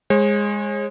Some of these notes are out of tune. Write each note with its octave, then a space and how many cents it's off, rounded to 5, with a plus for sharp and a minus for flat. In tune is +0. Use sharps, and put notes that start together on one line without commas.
G#3 -10 C#5 -45